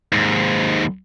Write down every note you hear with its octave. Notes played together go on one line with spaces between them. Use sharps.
D#2 G#2